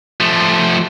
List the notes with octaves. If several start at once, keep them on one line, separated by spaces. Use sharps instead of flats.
F3 A3